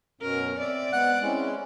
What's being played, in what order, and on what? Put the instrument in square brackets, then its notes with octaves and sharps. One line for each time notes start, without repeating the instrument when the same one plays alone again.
[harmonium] F#2 B2 C#4 [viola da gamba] A#4
[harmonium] C4 E5 [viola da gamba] D5
[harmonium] G#3 B3 [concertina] F#5 F#6
[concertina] G#3 [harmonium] C4 C#4 E4